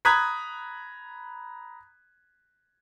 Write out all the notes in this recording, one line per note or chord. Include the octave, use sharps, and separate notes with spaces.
A#5 B5 D#6 F#6 G#6 B6